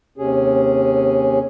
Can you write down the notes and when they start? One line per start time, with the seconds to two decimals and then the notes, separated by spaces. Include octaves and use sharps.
0.18 D#2 C3 C#4 G#4